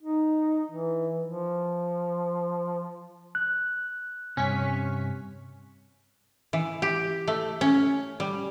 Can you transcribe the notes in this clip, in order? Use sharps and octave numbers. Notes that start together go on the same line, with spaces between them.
D#4
E3
F3
F#6
G2 C3 C#4 C#6 B6
E3
G4
A3
C#4
G3